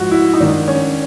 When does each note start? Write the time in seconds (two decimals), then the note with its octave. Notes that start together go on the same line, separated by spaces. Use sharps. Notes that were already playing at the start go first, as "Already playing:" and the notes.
Already playing: G#2 F3 F#4
0.11 E4
0.34 D#4
0.40 G#2 D#3 D4
0.68 C#4